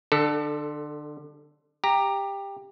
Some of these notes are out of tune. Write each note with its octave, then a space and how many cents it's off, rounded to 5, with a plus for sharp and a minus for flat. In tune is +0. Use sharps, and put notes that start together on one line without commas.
D3 +25 A4 +0
G4 +15 A#5 +0